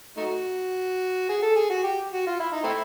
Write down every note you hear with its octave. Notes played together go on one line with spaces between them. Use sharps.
A3 D#4 F#4
G#4
A4
G#4
F#4
G4
F#4
F4
E4
D#4
A3 C4 E4